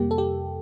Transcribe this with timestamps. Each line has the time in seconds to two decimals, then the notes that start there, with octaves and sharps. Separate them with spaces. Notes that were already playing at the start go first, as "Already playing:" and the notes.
Already playing: F2 C3 G3 A#3 G4
0.11 A4
0.18 G4